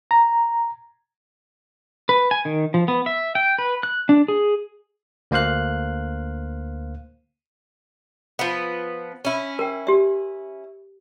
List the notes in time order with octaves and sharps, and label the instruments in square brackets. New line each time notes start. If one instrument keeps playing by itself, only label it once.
[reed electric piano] A#5
[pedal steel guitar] B4
G#5
D#3
F3
B3
E5
G5
B4
F#6
D4
G#4
[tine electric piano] D2 A#3 C5 F5 F#6
[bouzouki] F3 B3
C#4 E4
[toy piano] A#4 G5
G4 E5